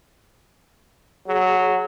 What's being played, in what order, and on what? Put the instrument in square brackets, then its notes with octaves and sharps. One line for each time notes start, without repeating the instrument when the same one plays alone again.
[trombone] F#3 [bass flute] G#4